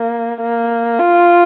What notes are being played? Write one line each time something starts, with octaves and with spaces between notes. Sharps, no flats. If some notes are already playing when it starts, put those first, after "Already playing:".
Already playing: A#3
A#3
F4